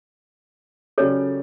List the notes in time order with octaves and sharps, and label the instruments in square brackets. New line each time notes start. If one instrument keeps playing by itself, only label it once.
[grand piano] C#3 F#3 C#4 G4 D5 [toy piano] A4 C#5